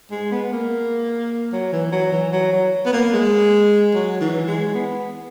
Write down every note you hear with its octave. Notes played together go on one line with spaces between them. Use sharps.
G#3
B3
A#3
F#3
E3
F#3
E3
F#3
F#3
B3
A#3
G#3
F#3
E3
G#3
B3